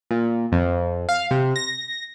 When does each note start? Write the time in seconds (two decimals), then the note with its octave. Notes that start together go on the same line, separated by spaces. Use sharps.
0.11 A#2
0.52 F2
1.09 F5
1.31 C3
1.56 A#6